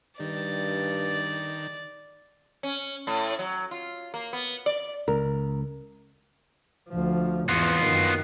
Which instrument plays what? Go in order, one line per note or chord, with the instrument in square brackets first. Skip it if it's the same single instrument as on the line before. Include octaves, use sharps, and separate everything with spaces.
[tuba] G2 [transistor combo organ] D#3 [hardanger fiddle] D5
[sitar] C#4
A2
F#3
F4
A#3
B3
D5
[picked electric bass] C#2 [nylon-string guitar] A#4
[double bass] D2 F3
[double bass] E2 G#2 [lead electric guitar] B3 F4
[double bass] F#2 D#3